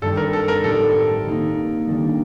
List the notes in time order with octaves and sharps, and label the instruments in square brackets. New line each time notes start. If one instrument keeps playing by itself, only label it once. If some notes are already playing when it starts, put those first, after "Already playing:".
[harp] G2 D#3 G3 C4 D#4 [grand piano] A4
[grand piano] A#4
A4
A#4
[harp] A2 G3 C4 D#4 [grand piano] A4
[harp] D#3 A#3 D#4
D#3 G3 D4